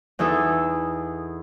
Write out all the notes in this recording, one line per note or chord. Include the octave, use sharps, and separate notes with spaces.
E2 E3 D#4 A4 E5